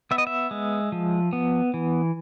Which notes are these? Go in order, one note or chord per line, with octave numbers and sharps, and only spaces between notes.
B3 E5
D#5
E5
G#3
F3
B3
E3